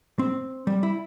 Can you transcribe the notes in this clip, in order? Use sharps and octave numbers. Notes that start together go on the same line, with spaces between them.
C4
G3
E4